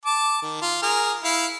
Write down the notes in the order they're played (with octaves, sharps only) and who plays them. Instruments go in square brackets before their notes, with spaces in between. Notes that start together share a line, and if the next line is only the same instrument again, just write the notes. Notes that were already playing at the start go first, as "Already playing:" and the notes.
[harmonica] A5 D6
D#3
F4
G#4 A#4 F6
E4 F5